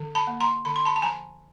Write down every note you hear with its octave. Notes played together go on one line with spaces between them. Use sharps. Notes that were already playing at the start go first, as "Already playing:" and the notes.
Already playing: D3
A5 B5
A#3
A#5 C6
D3 B5
C6
A5 B5
A5
F3 G#5 A#5